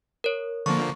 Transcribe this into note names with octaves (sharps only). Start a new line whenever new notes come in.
A#4 C#5
D3 F3 A#3 C#6